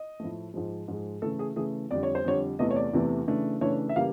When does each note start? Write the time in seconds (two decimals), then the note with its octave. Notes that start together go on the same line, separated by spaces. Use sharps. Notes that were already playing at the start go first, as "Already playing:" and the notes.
Already playing: D#5
0.20 A2 F3 A3
0.54 G#2 F3 G#3
0.88 G#2 F3 G#3
1.22 C#3 E3 A3 A4
1.39 G#4
1.56 C#3 E3 A3 G#4
1.91 F2 D3 G3 D5
2.03 C#5
2.15 C5
2.24 F2 D3 G3 C#5
2.59 E2 C3 E3 A3 D#5
2.71 C#5
2.76 D5
2.93 E2 C3 E3 A3
3.27 C#3 E3 A3 D4
3.61 C#3 E3 A3 D4 C#5
3.89 E5
3.96 C#3 E3 G3 A#3 F5